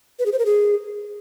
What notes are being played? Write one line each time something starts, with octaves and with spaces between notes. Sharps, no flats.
B4
G#4
C5
A#4
G#4